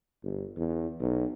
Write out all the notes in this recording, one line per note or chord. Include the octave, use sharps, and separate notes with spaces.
G1
E2
B1